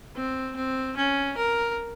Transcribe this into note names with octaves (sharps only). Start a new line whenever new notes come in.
C4
C4
C#4
A#4